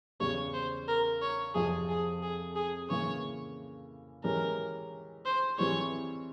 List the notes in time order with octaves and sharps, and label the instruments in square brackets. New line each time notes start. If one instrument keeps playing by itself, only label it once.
[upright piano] E2 C#3 G3 [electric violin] C#5
[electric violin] C5
A#4
C#5
[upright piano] F2 C3 F3 [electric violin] G#4
[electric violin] G#4
G#4
G#4
[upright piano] C#3 E3 A#3 [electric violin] C#5
[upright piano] E3 G#3 C#4 G4 [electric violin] A#4
[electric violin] C5
[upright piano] E3 G3 C4 E4 G#4 [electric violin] C#5